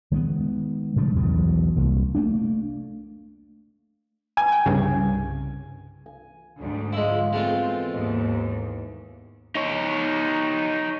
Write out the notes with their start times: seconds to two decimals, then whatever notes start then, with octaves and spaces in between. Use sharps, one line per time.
0.12 D#3 G#3 A#3 B3
0.96 A2 C#3 F3 G3
1.16 B1 E2 B2
1.76 C2 A#3
2.15 A3 A#3 D4
4.37 G#5
4.52 G5
4.66 C2 G2 C#3
6.06 G#5
6.59 D2 G#2 D3
6.93 F3 G#3 E4 F5
7.33 B2 E3 G#3 A3 C4 F4 G4
7.94 D#2 G#2
9.55 D#4 C#5